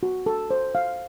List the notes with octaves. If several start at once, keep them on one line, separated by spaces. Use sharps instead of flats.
F#4
A4
C5
F5